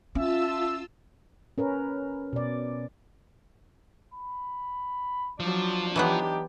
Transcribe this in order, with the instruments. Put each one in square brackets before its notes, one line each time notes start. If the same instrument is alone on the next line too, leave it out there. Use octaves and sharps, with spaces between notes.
[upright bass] C#4 [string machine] F4 A5 E6 [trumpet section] E5
[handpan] C#4 A#4 B4
B2 D5
[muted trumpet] B5
[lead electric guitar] F3 [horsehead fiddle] F#3 D5 [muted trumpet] D4
[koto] E3 F#3 B3 [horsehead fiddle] D4 G4 [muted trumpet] D#4